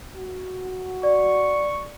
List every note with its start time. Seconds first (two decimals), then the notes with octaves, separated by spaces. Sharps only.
0.16 F#4
1.03 D5 C#6